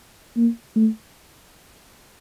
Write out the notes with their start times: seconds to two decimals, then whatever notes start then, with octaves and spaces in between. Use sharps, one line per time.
0.37 A#3
0.76 A3